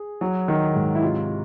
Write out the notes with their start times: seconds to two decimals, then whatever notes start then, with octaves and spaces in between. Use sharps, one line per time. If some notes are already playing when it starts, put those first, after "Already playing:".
Already playing: G#4
0.21 F#3
0.48 D#3
0.76 G#2
0.95 E4
1.02 C3 F4